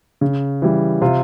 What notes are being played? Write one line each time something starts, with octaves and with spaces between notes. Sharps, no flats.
C#3
E3 G3
C3 F4